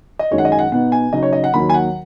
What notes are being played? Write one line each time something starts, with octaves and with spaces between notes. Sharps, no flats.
D#5
F#2 D#3 G#3 D#4 C#5
F#5
D#5
G#5
F#5
B2 B3 D#4 F#5
G#5
C#3 F#3 D#4 D#5
C#5
D#5
F#5
D#2 D#3 F#3 B5
G#5
F#5